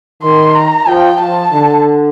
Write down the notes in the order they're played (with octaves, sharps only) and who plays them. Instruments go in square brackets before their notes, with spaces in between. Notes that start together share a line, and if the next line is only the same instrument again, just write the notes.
[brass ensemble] D#3 [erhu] C6
[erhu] A#5
[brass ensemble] F3 [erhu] G5
[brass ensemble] F3 [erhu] A5
[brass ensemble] D3